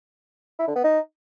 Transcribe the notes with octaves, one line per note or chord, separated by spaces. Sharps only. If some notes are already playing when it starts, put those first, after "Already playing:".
E4
D3
B3
D#4